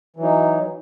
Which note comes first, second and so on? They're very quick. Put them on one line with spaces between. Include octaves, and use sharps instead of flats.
E3 F#3 D#4